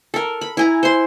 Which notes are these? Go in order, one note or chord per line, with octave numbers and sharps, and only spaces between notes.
A4 A#4
B5
E4 G#5 A#5
C5 C6